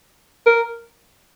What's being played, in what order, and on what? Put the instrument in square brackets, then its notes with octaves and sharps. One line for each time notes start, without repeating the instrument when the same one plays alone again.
[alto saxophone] A#4